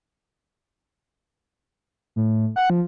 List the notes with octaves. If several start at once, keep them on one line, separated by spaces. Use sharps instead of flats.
A2
F#5
F3